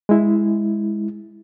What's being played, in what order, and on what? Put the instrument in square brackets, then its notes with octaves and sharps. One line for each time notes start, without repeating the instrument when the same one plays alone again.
[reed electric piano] G#3 E4